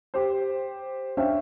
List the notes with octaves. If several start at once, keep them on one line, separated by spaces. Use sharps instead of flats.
G4 C5
C#4 D4 C5 E5 F5 G5